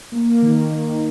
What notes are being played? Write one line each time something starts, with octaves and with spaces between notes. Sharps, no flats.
A#3
D#3
D#3